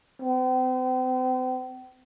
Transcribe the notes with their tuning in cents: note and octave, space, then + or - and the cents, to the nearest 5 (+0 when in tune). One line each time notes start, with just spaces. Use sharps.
C4 -40